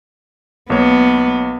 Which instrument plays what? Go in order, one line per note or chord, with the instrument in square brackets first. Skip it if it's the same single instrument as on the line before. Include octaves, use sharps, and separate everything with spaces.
[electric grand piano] B1 A#3 C#5 [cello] B3